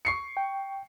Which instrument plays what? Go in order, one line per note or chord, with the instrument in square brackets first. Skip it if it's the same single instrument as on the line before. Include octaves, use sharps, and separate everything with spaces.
[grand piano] C#6 C7 C#7
[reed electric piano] G5